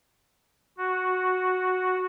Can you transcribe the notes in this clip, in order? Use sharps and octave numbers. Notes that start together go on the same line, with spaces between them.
F#4